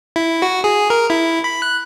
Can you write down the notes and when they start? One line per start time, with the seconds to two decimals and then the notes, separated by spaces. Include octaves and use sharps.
0.16 E4
0.42 F#4
0.64 G#4
0.90 A#4
1.10 E4
1.44 B5
1.62 F#6